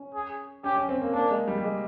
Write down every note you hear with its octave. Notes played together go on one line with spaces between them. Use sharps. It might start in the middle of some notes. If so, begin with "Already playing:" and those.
Already playing: C#4
G#4
C#4 G4
C#4
C4
A#3
A#3 D4
G#3
G3
G3
G#3